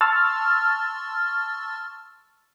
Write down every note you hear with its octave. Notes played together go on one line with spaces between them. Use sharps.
A5 C6 C#6 E6 F6 A6